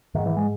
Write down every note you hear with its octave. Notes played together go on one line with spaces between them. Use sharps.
G#2 D#3
E3
G#3